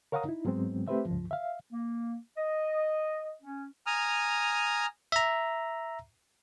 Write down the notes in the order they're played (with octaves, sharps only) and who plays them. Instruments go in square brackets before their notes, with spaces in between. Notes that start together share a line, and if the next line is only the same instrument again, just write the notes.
[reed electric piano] A#4 C#5 F5 F#5 A#5 D#6
D#4 E4
G#2 F#3 G#3 B3 C4
A3 C4 G4 B4 C5 E5
C#2 G2 F3
E5 F5
[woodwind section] A#3
D#5
C#4
[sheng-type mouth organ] G#5 A#5 D#6 F6
[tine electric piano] E5 A#5